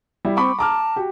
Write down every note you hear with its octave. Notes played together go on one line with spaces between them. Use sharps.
G3 E4
C4 B5 C#6 D6
A5 A#5 D6 F6
F#4 G4